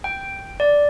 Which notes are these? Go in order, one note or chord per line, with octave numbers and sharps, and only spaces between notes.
G5
D5